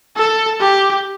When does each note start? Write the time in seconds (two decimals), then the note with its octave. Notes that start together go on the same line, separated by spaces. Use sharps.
0.17 A4
0.61 G4